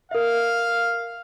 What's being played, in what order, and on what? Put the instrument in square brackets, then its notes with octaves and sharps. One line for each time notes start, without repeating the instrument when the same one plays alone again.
[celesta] A#4 E5 [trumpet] F5